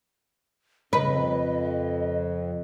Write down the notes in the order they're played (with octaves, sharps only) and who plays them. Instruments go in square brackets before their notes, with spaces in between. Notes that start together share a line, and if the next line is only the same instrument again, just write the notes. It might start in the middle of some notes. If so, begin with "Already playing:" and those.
[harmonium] F2 [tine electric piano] C#3 A#5 [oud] B4 [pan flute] D#5